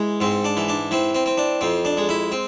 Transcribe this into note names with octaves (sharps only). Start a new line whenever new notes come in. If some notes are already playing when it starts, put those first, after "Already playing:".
Already playing: E3 G#3
G#2 C4
D4
E3
D4
E3 C4
C4
C4
D4
F2 C4
D4
G#3
E4
C4